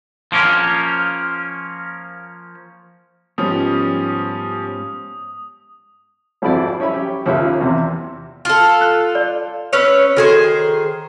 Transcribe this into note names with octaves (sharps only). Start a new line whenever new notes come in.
F3 A#3 C#4
G#2 F3 G3 G#3 B3 C#4 D#6
G#1 F2 G3 E4 C5 D5
C#4 C#5 E5 B5
G4
D#2 C#3 F3 A#3 E5
E2 C3
F4 A4
F#6
D5
C#4 B4 C#5 E6
D#3 F#4 G#4 A4 C5 G#6